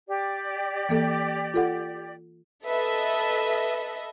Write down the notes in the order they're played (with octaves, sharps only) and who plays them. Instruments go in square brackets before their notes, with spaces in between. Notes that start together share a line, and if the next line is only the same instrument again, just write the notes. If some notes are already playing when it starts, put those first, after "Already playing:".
[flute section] G4 D5
[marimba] E3 A#3 A4
F4 A4 F#5
[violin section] A4 B4 D#5 E5